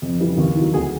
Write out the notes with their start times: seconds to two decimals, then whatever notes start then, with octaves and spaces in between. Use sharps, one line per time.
0.02 F2
0.20 C#3 E3 G3
0.38 D#2
0.55 D#3 F#3
0.74 D2 G#4